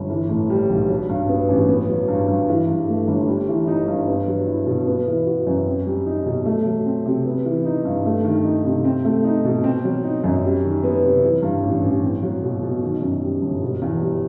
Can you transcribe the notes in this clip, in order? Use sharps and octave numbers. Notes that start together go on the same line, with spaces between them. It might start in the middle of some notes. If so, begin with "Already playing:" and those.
Already playing: G1
E3
A2
G3
B1
F#3
G2
B3
A1
B3
F#3
G2
G2
E3
G2
A3
G1
G3
E3
D#4
G2
B3
F#3
E4
B2
B3
E3
F#4
F#2
C4
G3
D#4
B2
A3
F#3
C4
C3
B3
E3
D#4
G2
A3
D#3
D#4
C3
C4
A3
D#4
B2
C4
F#3
D#4
F#2
G3
D#3
B3
C3
E3
G2
A1
A1
C4
F#3
B2
B2
D#3
F#2
G3
G1
B2
E2
G3